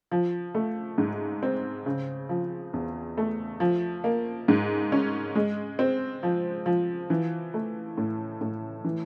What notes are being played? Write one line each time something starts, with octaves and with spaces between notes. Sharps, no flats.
F3
A3
G#2
C4
C#3
F3
E2
A3
F3
A#3
G#2
C#4
G#3
C4
F3
F3
E3
A3
A2
A2
E3